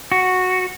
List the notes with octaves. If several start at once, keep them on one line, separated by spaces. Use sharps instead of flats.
F#4